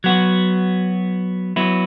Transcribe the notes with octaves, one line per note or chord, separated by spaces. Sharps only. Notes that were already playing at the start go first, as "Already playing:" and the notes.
F#3 B3 F#4
F#3 B3 E4